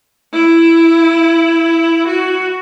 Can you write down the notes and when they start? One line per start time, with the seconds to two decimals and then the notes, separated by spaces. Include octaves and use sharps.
0.33 E4
2.07 F#4